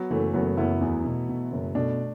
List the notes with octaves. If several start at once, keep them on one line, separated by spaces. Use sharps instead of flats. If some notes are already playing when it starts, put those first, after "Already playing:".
Already playing: F#3 B3
F#1 E3 A3
F#1 F#3 B3
F#1 B3 E4
E2
B2
B2
F#1
B2 A3 D4